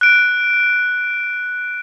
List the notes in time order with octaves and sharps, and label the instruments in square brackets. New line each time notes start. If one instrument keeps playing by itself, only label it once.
[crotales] F#6 D7